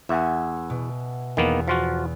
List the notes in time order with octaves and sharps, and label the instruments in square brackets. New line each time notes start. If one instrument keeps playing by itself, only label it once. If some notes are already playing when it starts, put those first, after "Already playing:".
[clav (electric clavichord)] E2 [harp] E5 F#5 G#5
[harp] B2
[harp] E2 [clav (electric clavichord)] D#3 A#3 B3
[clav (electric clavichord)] F3 F4 F#4